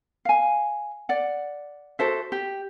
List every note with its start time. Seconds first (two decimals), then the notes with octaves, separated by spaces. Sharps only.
0.25 F5 G#5
1.09 D5 F#5
1.99 F#4 A4 C5 E5
2.32 G4